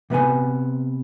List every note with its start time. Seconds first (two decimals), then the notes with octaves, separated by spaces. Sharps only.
0.10 C3 B3 B4 G#5